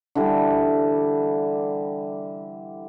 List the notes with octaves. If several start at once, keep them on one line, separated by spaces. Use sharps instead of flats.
D3 E3 G3